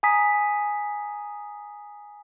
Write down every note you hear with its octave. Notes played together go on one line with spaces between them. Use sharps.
G#5 A#5 D#6 B6